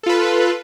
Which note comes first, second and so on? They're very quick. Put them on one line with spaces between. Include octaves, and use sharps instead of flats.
A4 F4 B4